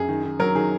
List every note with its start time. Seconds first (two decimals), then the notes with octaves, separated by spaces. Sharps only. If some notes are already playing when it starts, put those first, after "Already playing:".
Already playing: F#2 G#4
0.09 D#3
0.25 D#3
0.39 F#3 A#4
0.55 D#3 G#4